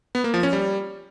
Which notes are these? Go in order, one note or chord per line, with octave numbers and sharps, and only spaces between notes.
B3
A#3
F3
C#4
G3